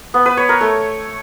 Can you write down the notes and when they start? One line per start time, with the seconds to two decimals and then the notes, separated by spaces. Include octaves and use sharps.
0.14 B3
0.26 B4
0.37 C#5
0.49 A#4
0.61 A3